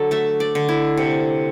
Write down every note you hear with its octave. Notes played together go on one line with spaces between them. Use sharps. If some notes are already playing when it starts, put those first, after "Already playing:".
Already playing: D3 F#3 A4
A3 E5
D5
D3
E4
C3